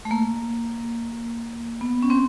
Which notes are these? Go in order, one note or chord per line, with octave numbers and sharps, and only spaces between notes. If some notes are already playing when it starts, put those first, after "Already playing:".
A3
A#3
B3
C#4
C4